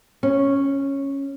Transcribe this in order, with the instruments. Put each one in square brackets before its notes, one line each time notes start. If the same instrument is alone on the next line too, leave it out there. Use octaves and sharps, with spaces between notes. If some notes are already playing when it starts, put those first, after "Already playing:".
[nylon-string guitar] C#4